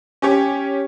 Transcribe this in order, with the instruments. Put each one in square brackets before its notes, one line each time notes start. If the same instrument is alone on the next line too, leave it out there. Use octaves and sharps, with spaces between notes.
[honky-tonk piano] C#4 G4 C#5